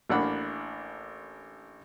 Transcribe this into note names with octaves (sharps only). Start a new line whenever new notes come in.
A1 A#3 D4 F#5 B5